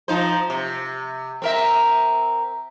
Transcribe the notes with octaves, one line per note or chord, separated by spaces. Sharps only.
F3 D#4 C5
C3
C4 A#4 E5